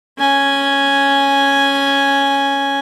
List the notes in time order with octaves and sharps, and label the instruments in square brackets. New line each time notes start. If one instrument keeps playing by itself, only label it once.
[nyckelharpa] C#4 G#5